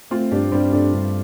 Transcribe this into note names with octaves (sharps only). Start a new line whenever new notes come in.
A3 C4 F4
G2 D4 G4
G2 G3 C4
G2 A3 D4
G2